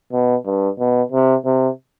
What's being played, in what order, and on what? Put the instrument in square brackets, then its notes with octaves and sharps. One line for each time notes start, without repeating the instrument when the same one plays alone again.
[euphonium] B2
G2
B2
C3
C3